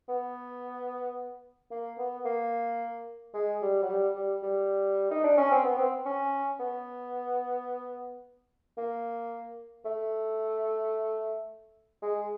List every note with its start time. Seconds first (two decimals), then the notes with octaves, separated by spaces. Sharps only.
0.09 B3
1.71 A#3
1.98 B3
2.25 A#3
3.34 G#3
3.62 G3
3.83 F#3
3.89 G3
4.16 G3
4.43 G3
5.11 D#4
5.24 D4
5.38 C#4
5.52 C4
5.65 B3
5.78 C4
6.06 C#4
6.60 B3
8.77 A#3
9.85 A3
12.02 G#3